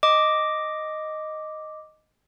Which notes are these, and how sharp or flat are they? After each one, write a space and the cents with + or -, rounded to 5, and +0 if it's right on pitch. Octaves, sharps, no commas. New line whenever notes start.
D#5 +0 D6 +0